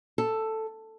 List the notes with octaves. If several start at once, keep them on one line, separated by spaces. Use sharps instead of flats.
A4